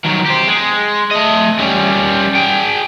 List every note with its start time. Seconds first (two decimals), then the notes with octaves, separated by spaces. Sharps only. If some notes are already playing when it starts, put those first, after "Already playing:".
0.04 D#3 F#3
0.25 G4 C5
0.47 G#3
1.11 A3 D#5
1.59 G3 C#4
2.35 G#4 G5